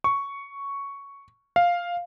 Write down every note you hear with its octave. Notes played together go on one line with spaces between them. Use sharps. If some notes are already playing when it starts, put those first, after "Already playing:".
C#6
F5